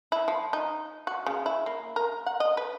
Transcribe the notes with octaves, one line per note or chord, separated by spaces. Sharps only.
E4
F3
D#4
F#4
C#3
E4
A#3
A#4
F#5
D#5
B4